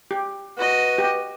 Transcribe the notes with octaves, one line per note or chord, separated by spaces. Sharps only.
G4
F#4 B4 D#5
G4